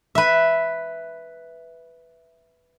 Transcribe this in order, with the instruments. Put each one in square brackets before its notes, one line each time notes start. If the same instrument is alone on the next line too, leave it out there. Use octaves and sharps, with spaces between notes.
[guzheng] B4 E5